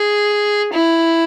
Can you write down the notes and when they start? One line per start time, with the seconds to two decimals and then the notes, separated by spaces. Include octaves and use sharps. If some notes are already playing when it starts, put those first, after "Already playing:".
Already playing: G#4
0.74 E4